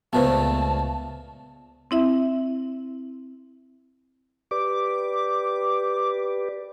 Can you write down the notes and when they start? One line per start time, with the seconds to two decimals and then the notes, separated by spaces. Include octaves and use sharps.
0.13 C#2 A#2 A3 B3 B4 C5 A5
1.91 C4 E4 E5
4.51 G4 B4 D5 D6